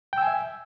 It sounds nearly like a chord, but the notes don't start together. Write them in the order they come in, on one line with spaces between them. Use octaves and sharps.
G5 E6 G#5 E5